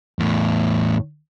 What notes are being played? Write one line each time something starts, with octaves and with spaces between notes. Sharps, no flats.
E2 A2